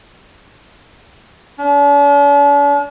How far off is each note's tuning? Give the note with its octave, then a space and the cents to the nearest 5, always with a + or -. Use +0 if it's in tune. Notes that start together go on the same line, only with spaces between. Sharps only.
D4 -45